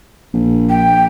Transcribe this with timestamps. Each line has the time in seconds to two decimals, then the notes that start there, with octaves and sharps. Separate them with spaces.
0.33 A#1
0.70 G5